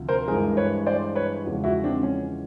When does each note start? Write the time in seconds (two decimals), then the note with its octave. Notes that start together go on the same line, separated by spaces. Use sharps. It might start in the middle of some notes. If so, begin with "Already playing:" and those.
Already playing: D2 C3 F3
0.09 A#4 C5
0.28 G2 E3 G#3 G#4 A#4
0.57 B4 C#5
0.86 C5 D5
1.15 B4 C#5
1.45 E2 C#3 F3 G#3
1.64 E4 F#4
1.84 C4 D4
2.03 C#4